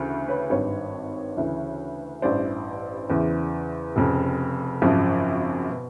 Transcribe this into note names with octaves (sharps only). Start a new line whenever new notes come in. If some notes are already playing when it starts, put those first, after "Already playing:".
Already playing: D2 C#3 E3
B4 C#5
G#1 G2 D#3 B4 C#5
D2 C#3 E3
A1 G2 E3 C5 D5
E2 C#3 E3
F1 F2 C#3
G#1 F#2 C#3 F3
B2